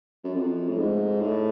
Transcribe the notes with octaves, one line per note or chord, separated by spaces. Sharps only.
F#2
F2
A2
G#2
A2